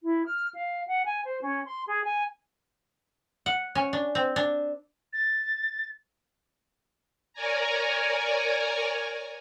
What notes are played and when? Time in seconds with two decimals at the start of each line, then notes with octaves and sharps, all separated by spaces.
0.03 E4
0.26 F6
0.54 F5
0.87 F#5
1.05 G#5
1.25 C5
1.42 C#4
1.65 C6
1.87 G#4
2.04 G#5
3.46 F#5
3.75 C#4
3.93 D4
4.15 C4
4.36 D4
5.13 A6
7.33 A#4 C#5 D5 G#5 A#5